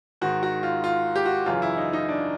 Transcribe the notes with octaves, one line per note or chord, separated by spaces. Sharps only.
G#2 D#3 F#4
F#4
F4
F4
G4
F#4
F#2 C#3 E3 F4
E4
D#4
D#4
D4